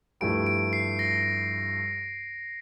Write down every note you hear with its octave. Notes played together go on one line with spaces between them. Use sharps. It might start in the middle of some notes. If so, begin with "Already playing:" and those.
G2 F3 A3 E4 G4 D7
D7
C7
A#6